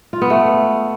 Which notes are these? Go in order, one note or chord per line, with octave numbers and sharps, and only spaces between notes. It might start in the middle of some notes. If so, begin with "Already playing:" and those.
F4
B3
A3